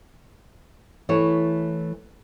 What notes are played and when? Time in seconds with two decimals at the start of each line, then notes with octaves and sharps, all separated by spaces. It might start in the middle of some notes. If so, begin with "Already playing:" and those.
1.09 E3 A3 E4 C#5